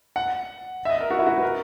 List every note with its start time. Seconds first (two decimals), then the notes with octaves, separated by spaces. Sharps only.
0.16 F#5
0.85 E5
0.89 D#5
1.00 A#4
1.10 F#4
1.19 E4
1.27 F#4
1.37 B4
1.43 A#4